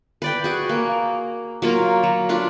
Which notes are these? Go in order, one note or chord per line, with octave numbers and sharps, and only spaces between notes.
B4 D5 G5
F#4 G#4
A#3
F#3 A#3 F4 A#4
F#3
D4 F4 B4